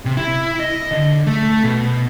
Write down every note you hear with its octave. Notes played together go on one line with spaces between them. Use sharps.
C3
E4
D#5
D3
A3
B2